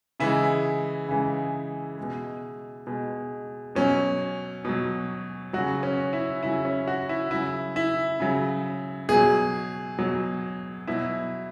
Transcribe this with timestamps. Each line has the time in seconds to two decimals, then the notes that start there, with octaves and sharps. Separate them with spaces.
0.20 C#3 E3 G#3 E4
1.08 C#3 E3 G#3
1.98 B2 G#3
2.87 B2 G#3
3.75 B2 F#3 C#4
4.65 B2 F#3
5.53 C#3 F#3 F#4
5.83 C#4
6.13 E4
6.43 C#3 F#3 E4
6.65 C#4
6.88 F#4
7.09 E4
7.31 C#3 F#3 E4
7.76 E4
8.20 C#3 F#3
9.09 B2 F#3 G#4
9.98 B2 F#3
10.87 B2 F#3 E4